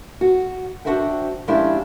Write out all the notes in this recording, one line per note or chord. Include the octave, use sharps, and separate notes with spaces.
F#4
D4 D#4 F#4 C5 E5 G5
F3 G#3 C#4 D4 E4 G4